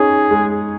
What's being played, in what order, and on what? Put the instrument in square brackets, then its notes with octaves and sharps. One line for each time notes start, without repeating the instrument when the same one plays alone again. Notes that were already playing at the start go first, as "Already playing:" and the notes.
Already playing: [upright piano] C#4 D#4 [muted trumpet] G#4
[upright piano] G#3